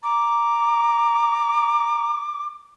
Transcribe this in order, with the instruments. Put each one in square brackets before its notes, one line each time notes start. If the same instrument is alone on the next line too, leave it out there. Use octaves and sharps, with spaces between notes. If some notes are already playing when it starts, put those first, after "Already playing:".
[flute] A#5 [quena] D6